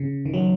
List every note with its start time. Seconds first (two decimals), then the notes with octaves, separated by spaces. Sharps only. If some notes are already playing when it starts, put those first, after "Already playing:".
Already playing: C#3
0.25 D#3
0.34 F#3